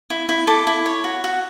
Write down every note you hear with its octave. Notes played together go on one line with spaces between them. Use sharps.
E4
E4
A4 D6
E4
C#5
F#4
F#4